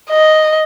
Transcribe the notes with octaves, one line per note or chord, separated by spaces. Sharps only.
D#5